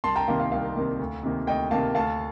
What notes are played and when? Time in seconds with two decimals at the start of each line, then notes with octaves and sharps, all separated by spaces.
0.04 C2 A5 C6
0.16 G5 A#5
0.28 C3 D#3 A#3 F5
0.40 F5
0.52 C2 F5
0.76 C3 D#3 A#3
0.99 D2
1.23 C3 D#3 A#3
1.47 D2 D#5 G5
1.71 C3 D#3 A#3 F5 A5
1.95 D2 F5 A5